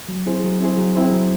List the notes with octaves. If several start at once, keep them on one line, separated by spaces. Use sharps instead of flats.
F#3
C4 E4 G#4 C5
F#3
C4 E4 G#4 C5
F#3
C4 E4 G#4 C5
F#3